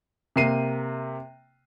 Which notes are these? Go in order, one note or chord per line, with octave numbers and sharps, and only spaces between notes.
C3 A#3 C7 D#7